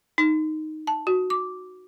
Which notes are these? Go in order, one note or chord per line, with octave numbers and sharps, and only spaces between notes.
D#4
A5
F#4
D6